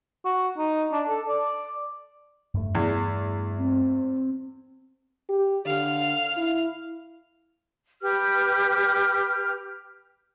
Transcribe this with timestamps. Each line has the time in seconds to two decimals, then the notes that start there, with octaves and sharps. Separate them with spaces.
0.25 F#4
0.58 D#4
0.92 D4
1.09 A4
1.28 D5
2.54 G2 A3
2.75 E2
3.58 C4
5.29 G4
5.67 D3 F5 F6
6.37 E4
8.02 G4 B4 F6